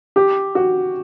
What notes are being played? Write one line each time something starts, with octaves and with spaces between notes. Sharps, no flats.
G4
F#4